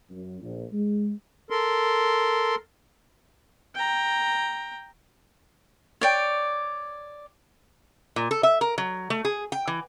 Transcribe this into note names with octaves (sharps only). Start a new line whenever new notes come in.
F#2
A#1
G#3
A4 A#4 C6
G5 A#5
C#5 D5 G5
A#2
A4
E5
A#4
F#3
A3
G#4
G5
E3